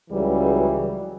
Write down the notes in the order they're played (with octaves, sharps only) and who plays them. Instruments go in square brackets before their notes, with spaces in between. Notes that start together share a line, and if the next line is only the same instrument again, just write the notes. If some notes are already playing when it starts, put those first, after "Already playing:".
[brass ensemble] C#2 C#3 E3 F#3 G3